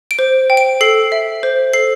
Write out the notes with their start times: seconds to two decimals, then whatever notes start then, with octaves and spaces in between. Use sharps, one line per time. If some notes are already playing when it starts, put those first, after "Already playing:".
0.11 D7
0.19 C5
0.50 G5
0.57 D7
0.81 A4 C7
1.12 E5
1.43 C5
1.73 A4 C7